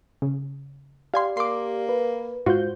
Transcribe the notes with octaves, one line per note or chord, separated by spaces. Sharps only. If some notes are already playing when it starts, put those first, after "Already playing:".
C#3
G4 D5 F5 G#5 C6
A#3 C6 D6
B4
G#2 F4 F#4 C5 G6